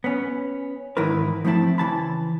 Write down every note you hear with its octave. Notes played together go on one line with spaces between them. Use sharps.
B3 C#4
G#2 D#3 E3 E4 A#4 B4
F3 A3 C4 E4 A5
C#3 E3 A5 B5